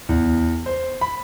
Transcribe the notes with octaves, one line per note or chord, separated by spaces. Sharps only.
E2
C5
B5